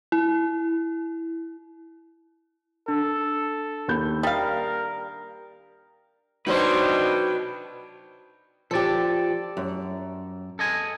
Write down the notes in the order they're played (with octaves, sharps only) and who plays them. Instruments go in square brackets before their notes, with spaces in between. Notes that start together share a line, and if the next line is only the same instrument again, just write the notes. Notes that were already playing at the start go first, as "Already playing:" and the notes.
[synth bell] E4
[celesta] D4 [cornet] A4
[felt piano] D#2 B5 G6
[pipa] G3 F5 [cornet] A#4 [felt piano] D#6
[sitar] B2 F#3 [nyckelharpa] D4 G5 [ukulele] D#4 C5 [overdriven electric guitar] B4 D#5
[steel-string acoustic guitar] F3 G4 [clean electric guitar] A4 D5
[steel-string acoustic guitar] F#2
[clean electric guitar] A4 D#5 G#5